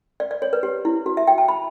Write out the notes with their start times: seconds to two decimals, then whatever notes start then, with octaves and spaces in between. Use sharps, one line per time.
0.20 D5
0.31 D5
0.42 C#5
0.53 B4
0.63 G4
0.85 E4
1.06 F#4
1.17 E5
1.27 G5
1.38 A5
1.48 B5